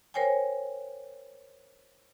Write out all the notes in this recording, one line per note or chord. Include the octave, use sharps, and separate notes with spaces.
A#4 C5 C#5 G5 G#5